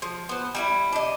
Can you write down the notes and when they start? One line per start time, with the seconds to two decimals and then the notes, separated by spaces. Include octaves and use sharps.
0.02 F3
0.29 B3 C5
0.55 G3 D#4 E4
0.93 D4 D#5